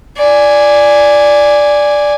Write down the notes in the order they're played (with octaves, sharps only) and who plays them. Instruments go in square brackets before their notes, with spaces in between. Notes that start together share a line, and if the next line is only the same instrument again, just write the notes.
[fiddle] D5 G#5